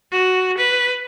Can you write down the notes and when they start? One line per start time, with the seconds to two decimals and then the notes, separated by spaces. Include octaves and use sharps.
0.12 F#4
0.57 B4